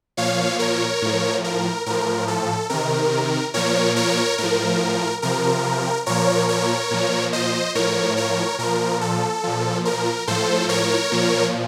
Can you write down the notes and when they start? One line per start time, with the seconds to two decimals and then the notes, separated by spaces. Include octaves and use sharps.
0.17 A#2 F3 C#5 F5
0.59 A#4 C#5
1.02 A2 F3
1.44 A#4
1.86 A2 F3 A#4
2.28 A4
2.70 C3 D#3 A#4
3.54 A#2 F3 A#4 C#5
3.96 A#4 C#5
4.38 A2 F3 A#4
5.22 C3 F3 A#4
6.06 A#2 F3 A#4 C#5
6.49 A#4 C#5
6.91 A#2 F3
7.33 C5 D#5
7.75 A2 F3 A#4 C#5
8.17 A#4 C#5
8.58 A#2 F3 A#4
9.01 A4
9.44 A#2 F3
9.85 A#4
10.27 A2 F3 A4 C5
10.69 A#4 C#5
11.12 A#2 F3